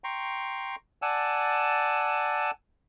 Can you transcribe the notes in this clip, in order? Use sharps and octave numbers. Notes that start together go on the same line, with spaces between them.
G5 A#5 C6 C#6
D5 F#5 G#5 A5 E6